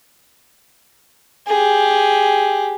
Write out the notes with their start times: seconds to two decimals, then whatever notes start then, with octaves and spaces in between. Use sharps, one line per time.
1.47 G4 G#4